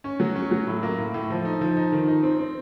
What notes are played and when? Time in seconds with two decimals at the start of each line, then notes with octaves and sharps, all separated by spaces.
0.04 C#4
0.20 F#3
0.36 C#4
0.51 F#3
0.67 A2
0.83 A#3
0.98 A2
1.14 A2
1.30 F3
1.45 D#4
1.61 F3
1.77 D#4
1.92 D#3
2.08 D#4
2.23 C4
2.39 C4